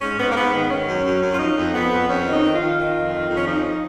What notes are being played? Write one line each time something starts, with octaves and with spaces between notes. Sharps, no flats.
G#2 C#4
G#2 B3
A#3
G#2 B3
D#3 B3
D#3 C#4
F#2
F#2
F#2
F4
F3 D#4
F2
F2 B3
F2
F2 C#4
D#3
D#4
D#3
F4
D#3
D#3
F2
D#3
F2
C#4
F3 D#4